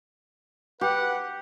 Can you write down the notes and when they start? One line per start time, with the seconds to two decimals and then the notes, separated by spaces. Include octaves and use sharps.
0.81 G4 B4 F#5